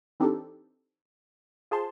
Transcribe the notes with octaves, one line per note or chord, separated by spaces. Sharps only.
E3 C4 D4 D#4 G4 A4
F4 G#4 C5 A5 C6